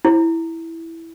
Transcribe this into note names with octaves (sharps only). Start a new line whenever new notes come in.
E4